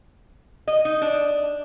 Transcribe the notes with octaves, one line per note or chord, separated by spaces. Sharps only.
D#5
D#4
D4